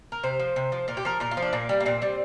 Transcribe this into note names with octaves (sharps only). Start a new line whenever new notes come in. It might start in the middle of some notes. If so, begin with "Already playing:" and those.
A#4
C3 C5
F3
C3
F3
A#2 A#4
G4
F3 A#4
A#2 A#4
F4
F3
D4
A#2 A#3
G3
A#3
A#2 C4
G3